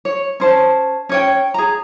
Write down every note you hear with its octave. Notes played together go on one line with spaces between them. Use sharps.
C#5
C#4 C5 A5
C#4 C#5 G5
G#4 A#5